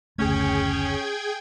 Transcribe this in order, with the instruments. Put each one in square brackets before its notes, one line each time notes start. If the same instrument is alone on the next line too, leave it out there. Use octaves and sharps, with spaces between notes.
[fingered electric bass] F#1 D2 A3 [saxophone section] C#4 [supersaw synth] G#4 G5 G#6